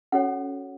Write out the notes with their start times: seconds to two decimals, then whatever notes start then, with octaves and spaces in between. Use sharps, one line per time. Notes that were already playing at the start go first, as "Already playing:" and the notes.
0.12 C#4 F#4 A4 C#5 F#5